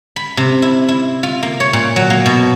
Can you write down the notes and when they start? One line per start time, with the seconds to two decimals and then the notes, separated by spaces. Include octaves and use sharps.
0.16 B5
0.37 C3
0.62 E4
0.89 E4
1.23 F4
1.43 A#3
1.60 C#5
1.73 A#2
1.96 F#3
2.10 A#3
2.26 B2